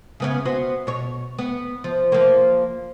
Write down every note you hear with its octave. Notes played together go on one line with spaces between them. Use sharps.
C#3 B3 C#4
B3 F#4 C5
B2 C#5
B3
F3
F3 A#3